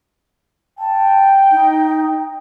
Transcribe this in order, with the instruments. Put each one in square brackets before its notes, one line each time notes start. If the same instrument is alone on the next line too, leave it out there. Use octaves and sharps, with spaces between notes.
[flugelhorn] G5 [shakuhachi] A5
[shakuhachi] D#4